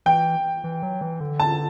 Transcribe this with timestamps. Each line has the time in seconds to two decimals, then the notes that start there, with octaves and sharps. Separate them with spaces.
0.06 E3 G5
0.64 E3
0.83 F#3
1.01 E3
1.20 D3
1.40 A5